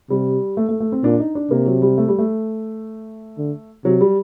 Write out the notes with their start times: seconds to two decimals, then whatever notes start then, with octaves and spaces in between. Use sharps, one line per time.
0.10 C3 G3
0.57 A3
0.69 A3
0.80 A3
0.92 C4
1.03 A#2 D4
1.19 D#4
1.35 D4
1.51 C3 A#3
1.66 F#3
1.82 G3
1.98 A3
2.08 G3
2.19 A3
3.38 D3
3.85 C3 F#3
4.01 G3